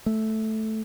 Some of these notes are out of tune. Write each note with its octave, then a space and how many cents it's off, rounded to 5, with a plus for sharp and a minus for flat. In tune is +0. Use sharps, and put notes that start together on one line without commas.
A3 -5